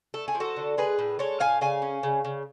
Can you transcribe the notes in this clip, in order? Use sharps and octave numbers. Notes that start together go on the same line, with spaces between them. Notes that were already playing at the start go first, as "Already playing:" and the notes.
A3 A4
G#4
F3
F#4 A4
D3
G#3 G#4 B4
A2
G#3 A4 C#5
A2 F5 G#5
C#3 F5 G#5
C#4
C#3
C#3